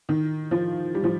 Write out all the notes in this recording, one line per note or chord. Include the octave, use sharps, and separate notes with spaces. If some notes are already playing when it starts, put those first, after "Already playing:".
D#3
F3
G3
F3